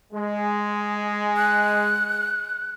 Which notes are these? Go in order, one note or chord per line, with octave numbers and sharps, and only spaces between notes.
G#3
F#6